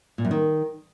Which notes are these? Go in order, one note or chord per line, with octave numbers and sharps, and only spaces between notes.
A#2
F#2
D#3